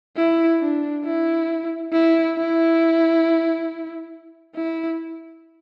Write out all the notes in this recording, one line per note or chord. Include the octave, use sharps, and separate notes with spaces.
E4
D4
E4
E4
E4
E4